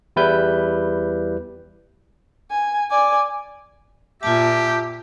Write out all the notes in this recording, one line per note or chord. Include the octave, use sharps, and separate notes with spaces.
E2 G3 E4 B4 G6
G#5
D5 G#5
A#2 F4 G4 E5 A5